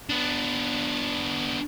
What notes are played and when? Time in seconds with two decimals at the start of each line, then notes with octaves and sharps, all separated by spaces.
0.10 B3 D4